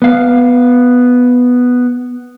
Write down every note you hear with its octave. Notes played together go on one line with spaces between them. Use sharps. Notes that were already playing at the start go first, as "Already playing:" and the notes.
B3 F5